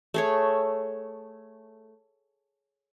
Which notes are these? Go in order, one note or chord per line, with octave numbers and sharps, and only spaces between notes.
A3 G#4 C#5